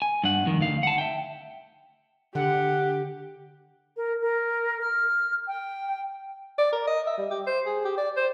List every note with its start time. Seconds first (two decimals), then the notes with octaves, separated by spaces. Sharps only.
0.02 G#5
0.24 G2 F#5
0.45 F2 D#3
0.61 D2 F5
0.83 F#5 A5
0.98 E5 G5
2.35 D3 G4 F#5
3.96 A#4
4.21 A#4
4.81 F6
5.47 G5
6.58 D5
6.73 A#4
6.87 D#5
7.07 E5
7.18 G3
7.30 G4
7.46 C5
7.66 G#4
7.85 G4
7.97 D5
8.16 C5